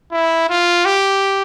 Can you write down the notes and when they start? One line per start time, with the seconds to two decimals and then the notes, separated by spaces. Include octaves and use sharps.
0.12 E4
0.50 F4
0.86 G4